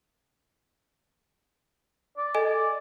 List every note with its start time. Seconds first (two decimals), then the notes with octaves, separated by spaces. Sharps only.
2.18 D5
2.35 A4 D#5 G#5